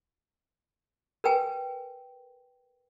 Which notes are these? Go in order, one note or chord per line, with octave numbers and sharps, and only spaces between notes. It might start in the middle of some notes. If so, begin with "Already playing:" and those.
A#4 B4 G5 G#5